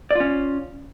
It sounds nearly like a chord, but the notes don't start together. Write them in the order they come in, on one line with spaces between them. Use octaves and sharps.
D5 F4 C#4